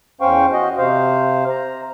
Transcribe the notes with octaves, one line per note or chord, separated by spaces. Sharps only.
E2 C#4 C5 F5 G5 C#6
F#4 D#5
C3 C5 F5
A#5